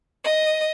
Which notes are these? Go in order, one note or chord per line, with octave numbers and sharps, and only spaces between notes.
D#5